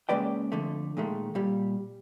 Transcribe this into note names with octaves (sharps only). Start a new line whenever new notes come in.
C#3 G#3 A#3 B4 D5 G5
F2 D3 A3
A#2 D#3 G#3 A3
A#2 G3